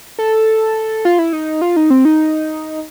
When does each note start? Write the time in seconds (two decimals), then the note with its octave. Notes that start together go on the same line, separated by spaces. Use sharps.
0.19 A4
1.05 F4
1.19 E4
1.33 D#4
1.62 F4
1.76 D#4
1.90 C4
2.05 D#4